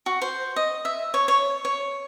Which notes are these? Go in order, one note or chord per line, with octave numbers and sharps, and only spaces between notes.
F#4
C5
D#5
E5
C#5
C#5
C#5